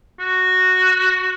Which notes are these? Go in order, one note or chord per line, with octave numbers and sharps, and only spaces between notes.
F#4